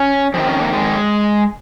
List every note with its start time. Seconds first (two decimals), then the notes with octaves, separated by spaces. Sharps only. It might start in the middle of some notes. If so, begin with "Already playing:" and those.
Already playing: C#4
0.34 F2 D#3 C4
0.47 C#4
0.60 A#3
0.73 G#3